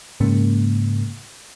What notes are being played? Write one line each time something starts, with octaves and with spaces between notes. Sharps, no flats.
G#2 C#3 A#3